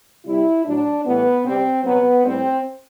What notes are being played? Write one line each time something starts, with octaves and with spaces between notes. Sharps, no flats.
C3 G3 E4
A2 F#3 D4
A2 E3 G3 B3
C3 G3 C4
C3 F#3 B3
A2 G3 C4